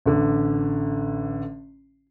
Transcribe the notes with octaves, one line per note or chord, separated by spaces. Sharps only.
A1 D3